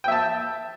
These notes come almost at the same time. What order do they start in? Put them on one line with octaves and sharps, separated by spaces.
G5 E5 A5